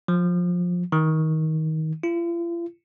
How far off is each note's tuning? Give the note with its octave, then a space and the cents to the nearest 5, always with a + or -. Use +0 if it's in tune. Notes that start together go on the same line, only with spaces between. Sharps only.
F3 +20
D#3 +20
F4 -45